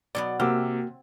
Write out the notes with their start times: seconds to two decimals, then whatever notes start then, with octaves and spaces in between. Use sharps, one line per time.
0.15 B2 F#3 B3 D5
0.40 C3 A#3 C4 F#4 D6 E6 F6